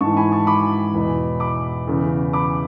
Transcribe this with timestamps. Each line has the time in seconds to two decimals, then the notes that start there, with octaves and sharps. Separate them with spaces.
0.01 G#2 E3 A5 C#6
0.17 G#5 B5
0.32 A5 C#6
0.47 B5 D6
0.94 E2 B2
1.40 B5 D6
1.87 E2 C#3 E3
2.33 B5 D6